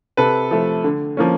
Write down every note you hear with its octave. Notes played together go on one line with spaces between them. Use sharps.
C3 A4 B4
F3 A3
D3
F3 A#3 C#4